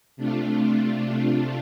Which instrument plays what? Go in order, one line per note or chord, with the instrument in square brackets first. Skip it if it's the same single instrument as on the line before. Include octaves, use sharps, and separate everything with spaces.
[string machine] C3 A3 D4 F4